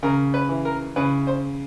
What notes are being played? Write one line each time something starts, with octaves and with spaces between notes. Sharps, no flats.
C#3 A#4
B4
E3
A#4
C#3 B4
C5